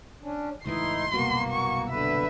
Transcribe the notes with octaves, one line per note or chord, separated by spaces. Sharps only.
C#4 D4
C#2 A2 E3 D#4 E4 C6
F#1 C2 B2 A#3 F#4
C#6
D3 B4 E5